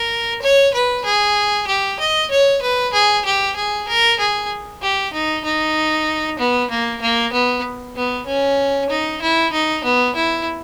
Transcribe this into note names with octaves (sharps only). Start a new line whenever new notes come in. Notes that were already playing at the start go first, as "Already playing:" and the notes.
Already playing: A#4
C#5
B4
G#4
G4
D#5
C#5
B4
G#4
G4
G#4
A#4
G#4
G4
D#4
D#4
B3
A#3
A#3
B3
B3
C#4
D#4
E4
D#4
B3
E4